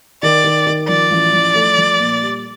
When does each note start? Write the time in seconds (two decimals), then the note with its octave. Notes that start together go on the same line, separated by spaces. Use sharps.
0.23 D#3 D5
0.44 D#3
0.67 D#3
0.89 F3 D5
1.11 A1
1.33 F3
1.55 A3
1.78 F3
2.00 A#2
2.22 G3